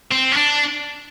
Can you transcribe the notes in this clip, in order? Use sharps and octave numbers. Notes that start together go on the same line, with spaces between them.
C4
C#4
D4